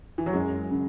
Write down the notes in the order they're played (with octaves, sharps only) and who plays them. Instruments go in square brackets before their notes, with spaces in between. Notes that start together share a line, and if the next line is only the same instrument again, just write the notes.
[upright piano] E3
F#3
[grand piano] F#2 [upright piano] G#3
[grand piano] C#3